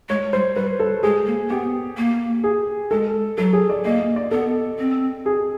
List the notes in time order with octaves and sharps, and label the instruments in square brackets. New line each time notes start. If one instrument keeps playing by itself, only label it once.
[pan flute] G#3 [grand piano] C#5
[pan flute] G3 [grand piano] C5
[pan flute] G3 [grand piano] B4
[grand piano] A4
[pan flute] G#3 [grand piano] G#4
[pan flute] A#3
[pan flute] B3 [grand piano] G4
[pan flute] A#3
[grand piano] G#4
[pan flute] G#3 [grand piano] A4
[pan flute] F#3 [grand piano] A4
[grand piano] G#4
D5
[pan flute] A#3 [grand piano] D#5
[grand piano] D#5
D5
[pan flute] B3 [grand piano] A4
[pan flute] C4
[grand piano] G#4